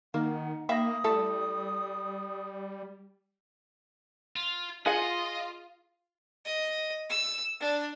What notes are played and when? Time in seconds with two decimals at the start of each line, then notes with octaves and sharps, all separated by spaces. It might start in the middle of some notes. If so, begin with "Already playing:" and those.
0.14 D#3 A#3 D#4 F#5
0.69 A#3 E5 F5 G5 B5 D#6 A#6
1.04 G3 A3 E4 A4
4.36 F4
4.86 F4 G#4 D#5 F#5
6.45 D#5
7.10 E6
7.60 D4